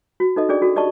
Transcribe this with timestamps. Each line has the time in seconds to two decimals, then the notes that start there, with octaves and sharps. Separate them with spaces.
0.20 F#4
0.36 D#4 A4 D#5
0.49 C#4 D4 G#4 D5
0.62 F#4 A4
0.76 G4 D5 D#5 A5 C#6